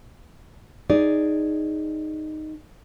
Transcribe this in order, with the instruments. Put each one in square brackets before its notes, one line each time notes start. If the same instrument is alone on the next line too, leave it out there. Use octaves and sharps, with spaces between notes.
[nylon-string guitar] D#4 G#4 D5